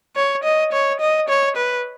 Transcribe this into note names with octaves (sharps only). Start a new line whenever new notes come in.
C#5
D#5
C#5
D#5
C#5
B4